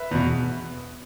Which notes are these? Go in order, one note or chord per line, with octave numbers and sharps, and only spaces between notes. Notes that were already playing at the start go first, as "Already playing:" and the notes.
Already playing: B4 E5
E2 B2